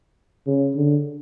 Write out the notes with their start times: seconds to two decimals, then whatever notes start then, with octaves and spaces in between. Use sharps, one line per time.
0.47 C#3
0.75 D3